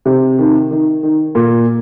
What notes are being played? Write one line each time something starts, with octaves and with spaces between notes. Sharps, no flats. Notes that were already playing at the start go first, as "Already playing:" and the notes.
C3
D#3
D#3
D#3
A#2